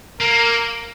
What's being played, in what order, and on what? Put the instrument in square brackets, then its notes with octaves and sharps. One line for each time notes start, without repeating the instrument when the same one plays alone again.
[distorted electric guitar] A#3 [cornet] A#4